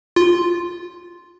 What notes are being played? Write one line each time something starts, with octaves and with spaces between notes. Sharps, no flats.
F4